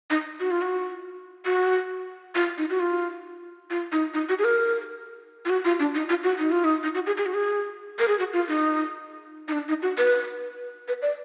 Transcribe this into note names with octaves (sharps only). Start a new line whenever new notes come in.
D#4
F#4
F4
F#4
F#4
F4
D#4
F#4
F4
F4
D#4
D#4
F#4
G#4
A#4
F4
F#4
F4
D4
D#4
F4
F#4
D#4
F4
D#4
D#4
F#4
G#4
G#4
F#4
G#4
A#4
G#4
F#4
F4
D#4
D#4
D4
D#4
F#4
B4
B4
D5